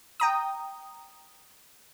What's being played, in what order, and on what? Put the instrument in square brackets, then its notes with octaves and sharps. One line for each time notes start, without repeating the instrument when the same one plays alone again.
[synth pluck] G5 A#5 D#6